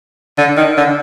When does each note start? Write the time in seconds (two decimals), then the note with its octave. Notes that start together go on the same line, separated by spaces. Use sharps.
0.38 D3
0.57 D#3
0.77 D3